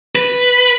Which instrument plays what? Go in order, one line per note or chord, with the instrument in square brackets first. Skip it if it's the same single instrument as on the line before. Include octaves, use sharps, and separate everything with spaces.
[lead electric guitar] B4